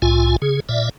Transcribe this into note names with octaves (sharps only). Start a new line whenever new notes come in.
C2 A2 F4 G#5
C#3 G#4
A#2 D5 E5